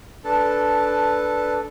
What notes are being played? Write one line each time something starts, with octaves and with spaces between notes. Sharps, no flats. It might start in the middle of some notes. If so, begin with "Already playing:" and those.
D4 A4 B4 A5